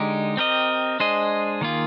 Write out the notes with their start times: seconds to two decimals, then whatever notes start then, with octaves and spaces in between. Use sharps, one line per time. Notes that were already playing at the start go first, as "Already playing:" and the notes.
Already playing: D3 G#3 D#4 G4
0.37 C4 G4 A#4 D#5
1.00 G#3 D4 G#4 C5 D#5
1.61 D#3 A#3 F4 G#4